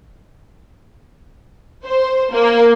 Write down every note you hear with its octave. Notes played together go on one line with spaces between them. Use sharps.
C5
A#3